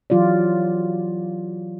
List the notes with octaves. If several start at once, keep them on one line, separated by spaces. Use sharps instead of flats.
E3 F#3 F4 G4 D5